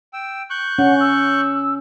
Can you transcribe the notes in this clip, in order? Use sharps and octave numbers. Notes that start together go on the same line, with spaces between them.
G5 E6
C#6 F#6 G6
C#4 F#5
E6